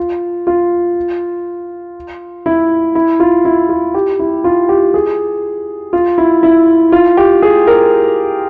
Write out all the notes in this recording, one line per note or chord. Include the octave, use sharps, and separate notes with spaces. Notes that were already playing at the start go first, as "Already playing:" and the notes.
Already playing: F4
F4
E4
E4
F4
E4
F4
G4
E4
F4
G4
G#4
F4
E4
E4
F4
G4
G#4
A#4